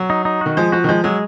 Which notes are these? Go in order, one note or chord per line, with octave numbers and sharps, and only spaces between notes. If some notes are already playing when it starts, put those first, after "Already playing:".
Already playing: F#3
D#4
D#4
D#3 F#4
F3 G#3
F3 F#4
D#3
F3 G#3
F#3 G#3